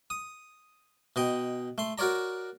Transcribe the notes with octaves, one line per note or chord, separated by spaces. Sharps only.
D#6
B2 D#5 G5
A3 C6
F#4 A#4 C#5 D5 A#5